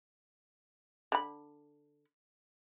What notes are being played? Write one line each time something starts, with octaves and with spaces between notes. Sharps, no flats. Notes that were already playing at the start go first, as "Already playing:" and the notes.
D3 B5